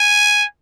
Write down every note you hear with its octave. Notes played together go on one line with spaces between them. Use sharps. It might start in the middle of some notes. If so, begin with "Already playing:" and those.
Already playing: G#5